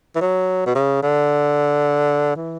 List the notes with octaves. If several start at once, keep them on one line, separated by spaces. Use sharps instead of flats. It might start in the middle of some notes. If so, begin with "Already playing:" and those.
E3
F#3
B2
C#3
D3
E3